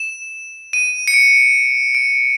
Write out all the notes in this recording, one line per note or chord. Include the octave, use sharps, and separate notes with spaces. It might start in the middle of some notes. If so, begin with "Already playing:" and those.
Already playing: E7
D#7
C#7
D7
D7